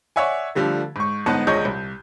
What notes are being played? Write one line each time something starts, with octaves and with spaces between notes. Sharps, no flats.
C#5 D5 E5 F#5 G#5
D3 F3 G3 A3
G#2 C#6
G1 G#2 B3 D#4 A5 F#6
D#1 A#1 G#3 C#5 D#5 G6
C2